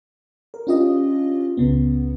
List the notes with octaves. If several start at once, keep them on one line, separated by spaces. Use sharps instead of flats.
A#4
C#4 D4 F4 G4 D#5
C#2 C#3 B3